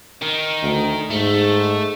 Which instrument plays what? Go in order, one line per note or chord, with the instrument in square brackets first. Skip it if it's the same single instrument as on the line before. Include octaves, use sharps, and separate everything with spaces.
[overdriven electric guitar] D#3
[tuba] D2
[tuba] G#2 [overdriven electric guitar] A3